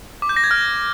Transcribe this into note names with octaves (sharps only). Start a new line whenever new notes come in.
D6
G6
A#6
G#6
F6